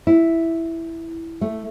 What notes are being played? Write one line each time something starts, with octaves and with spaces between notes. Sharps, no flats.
E4
A3